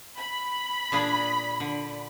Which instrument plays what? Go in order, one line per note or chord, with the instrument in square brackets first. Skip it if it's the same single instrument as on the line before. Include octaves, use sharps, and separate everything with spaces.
[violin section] B5
[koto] A#2 D4 G#4
D3